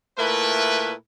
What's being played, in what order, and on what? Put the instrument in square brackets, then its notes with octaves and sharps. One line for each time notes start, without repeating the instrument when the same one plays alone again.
[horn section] A#2 A3 E4 A#4 B4